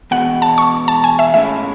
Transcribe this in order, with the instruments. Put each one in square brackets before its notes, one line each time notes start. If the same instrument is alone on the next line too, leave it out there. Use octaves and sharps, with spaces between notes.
[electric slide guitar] E2 B2 G#3 B3 [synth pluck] F#5
[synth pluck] A5
C#6
A5
G#5
E5
[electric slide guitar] A2 G#3 C#4 E4 [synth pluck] E5